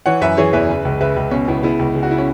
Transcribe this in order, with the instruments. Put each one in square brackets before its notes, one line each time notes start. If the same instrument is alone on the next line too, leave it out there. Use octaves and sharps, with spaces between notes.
[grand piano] E3 C#5 F#5
F#2 B4 E5
E3 G#4 C#5
E2 B4 E5
C#3
C#2
C#3 B4 E5
C#2
B2 C#4
C#2 B3 E4
C#3 B3 E4
C#2
C#3
F#4
E4
C#4